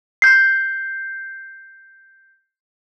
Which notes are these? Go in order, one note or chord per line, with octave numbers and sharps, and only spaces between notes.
G6 C7